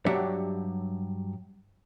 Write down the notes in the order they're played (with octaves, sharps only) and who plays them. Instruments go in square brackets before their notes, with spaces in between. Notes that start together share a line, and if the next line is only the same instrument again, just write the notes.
[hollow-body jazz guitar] G2 F#3 D4 G4 E5 F#5